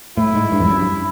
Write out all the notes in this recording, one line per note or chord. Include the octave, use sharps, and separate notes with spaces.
A2 E4
G#2
G2
F2
F#2
G2